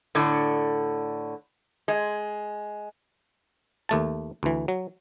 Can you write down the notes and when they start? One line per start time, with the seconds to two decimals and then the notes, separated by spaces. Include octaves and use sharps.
0.15 A2 D3
1.88 G#3
3.89 D#2 A3 A5
4.43 D2 E3
4.68 F#3